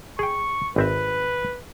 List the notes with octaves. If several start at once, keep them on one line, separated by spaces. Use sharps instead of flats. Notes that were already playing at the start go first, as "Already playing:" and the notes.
G#4 G5 C#6
G#1 C4 B4 E5